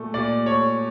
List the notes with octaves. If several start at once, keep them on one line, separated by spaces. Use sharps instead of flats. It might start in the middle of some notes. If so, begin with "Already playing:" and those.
Already playing: A#2 A3
A#2 D5
A3 C#5